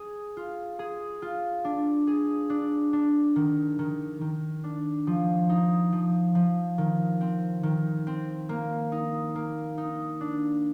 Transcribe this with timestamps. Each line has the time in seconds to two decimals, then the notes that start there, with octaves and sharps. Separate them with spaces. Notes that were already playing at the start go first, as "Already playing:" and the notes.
Already playing: G#4
0.37 F4
0.79 G#4
1.22 F4
1.65 D4
2.07 G#4
2.50 D4
2.93 D4
3.36 D#3
3.79 D#3
4.21 D#3
4.64 D4
5.07 F3
5.49 D#4
5.92 F3
6.35 F3
6.78 D#3
7.21 C4
7.63 D#3
8.07 C4
8.49 A#3
8.92 D#4
9.35 A#3
9.78 D#4
10.21 D4